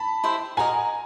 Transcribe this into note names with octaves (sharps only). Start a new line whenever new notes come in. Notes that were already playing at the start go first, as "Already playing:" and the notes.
Already playing: A5 B5
E4 G4 C5 E5
F#4 A#4 D#5 G#5 A#5